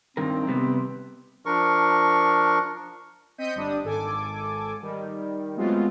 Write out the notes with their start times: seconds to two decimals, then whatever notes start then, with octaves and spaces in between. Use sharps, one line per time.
0.17 G2 D#3 C4 A#4
0.47 C3 G3 B3
1.46 F3 D4 A#4 C#6
3.38 C4 D#5 G6 B6 C#7 D#7
3.55 G1 G3 D4 D#6
3.84 G#1 A4 G#5 D6
4.82 D#3 G3
5.57 F#3 G#3 A3 B3 C4 F4